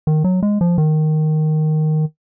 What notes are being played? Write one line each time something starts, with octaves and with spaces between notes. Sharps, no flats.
D#3
F#3
G#3
F3
D#3